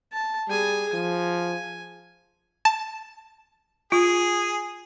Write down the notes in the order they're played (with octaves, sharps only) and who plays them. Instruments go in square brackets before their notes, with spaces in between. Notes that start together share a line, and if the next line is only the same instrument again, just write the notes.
[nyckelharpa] A5
[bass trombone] G3 [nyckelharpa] G#4 G#5
[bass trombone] F3 [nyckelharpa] G#5
[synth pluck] A5
[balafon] F4 [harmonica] G#4